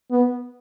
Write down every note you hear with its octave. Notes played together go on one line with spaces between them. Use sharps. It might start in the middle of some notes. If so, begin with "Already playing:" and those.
B3